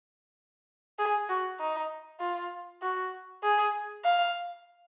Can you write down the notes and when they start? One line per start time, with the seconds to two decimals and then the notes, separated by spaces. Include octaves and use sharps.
0.99 G#4
1.29 F#4
1.60 D#4
2.20 F4
2.82 F#4
3.43 G#4
4.05 F5